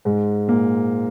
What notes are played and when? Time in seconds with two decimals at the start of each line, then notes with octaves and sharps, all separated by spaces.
0.05 G#2 G#3
0.48 A#2 A#3